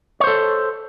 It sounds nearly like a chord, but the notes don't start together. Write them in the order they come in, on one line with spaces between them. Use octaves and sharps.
C#5 C5 A4